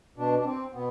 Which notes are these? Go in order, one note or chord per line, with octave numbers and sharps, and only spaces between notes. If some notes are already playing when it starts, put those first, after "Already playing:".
B2 D4
D4
C4
B2 B3